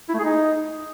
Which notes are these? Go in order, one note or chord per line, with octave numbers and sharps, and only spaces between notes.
E4
A3
G#4
D#4